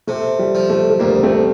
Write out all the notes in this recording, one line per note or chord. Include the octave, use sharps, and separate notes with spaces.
C3 A3
G3
F3
A3
A3
D2 G3 A#3
A3 C4